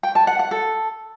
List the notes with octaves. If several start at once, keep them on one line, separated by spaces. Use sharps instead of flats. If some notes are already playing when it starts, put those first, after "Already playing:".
G5
A5
F#5
F#5
A4